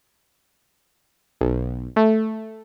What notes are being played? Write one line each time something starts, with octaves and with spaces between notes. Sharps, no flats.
B1
A3